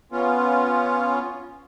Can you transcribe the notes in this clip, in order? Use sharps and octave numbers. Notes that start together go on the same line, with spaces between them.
B3 C#4 F4